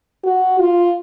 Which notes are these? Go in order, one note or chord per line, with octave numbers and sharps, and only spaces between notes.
F#4
F4